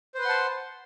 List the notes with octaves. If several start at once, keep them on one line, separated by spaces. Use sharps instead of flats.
B4 C5 F#5 A5 C6